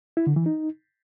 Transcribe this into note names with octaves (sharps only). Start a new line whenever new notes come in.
E4
D3
E3
D#4